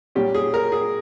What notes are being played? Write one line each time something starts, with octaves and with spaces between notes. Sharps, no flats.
A#2 G3 C#4 G4
G#4
A#4
G#4